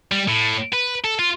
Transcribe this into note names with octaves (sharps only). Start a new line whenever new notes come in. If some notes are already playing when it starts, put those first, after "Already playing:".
G3
A2
B4
A4
F4